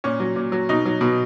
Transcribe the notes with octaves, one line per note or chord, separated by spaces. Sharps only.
A#2 C#4
F#3
A#2
F#3
B2 D#4
F#3
B2